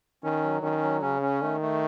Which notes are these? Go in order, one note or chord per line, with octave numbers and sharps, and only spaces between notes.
D#3 C#4
F#3
D#3 C#4
F#3
C#3 C#4
C#4
D#3 A3
A3